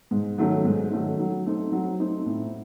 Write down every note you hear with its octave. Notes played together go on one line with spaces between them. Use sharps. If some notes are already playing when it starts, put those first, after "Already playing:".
G#2
D#3 F#3 A3 C#4
G#2
D#3 F#3 A3 C#4
F#3
A3 C4 D#4
F#3
A3 C4 D#4
A2